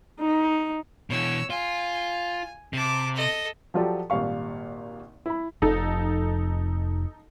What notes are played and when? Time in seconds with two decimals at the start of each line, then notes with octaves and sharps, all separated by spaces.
0.20 D#4
1.10 B2 E3 C#5 E6
1.50 F4 G#5
2.73 C3 A5 D6
3.15 A4 D#5
3.74 F3 F#3 F4 G4 A4 D5
4.10 G#1 A#2 G3 F5 C#6
5.26 E4 B5
5.62 F1 F2 D#4 A4